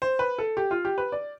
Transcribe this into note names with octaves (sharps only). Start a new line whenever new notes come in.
C5
B4
A4
G4
F4
G4
B4
D5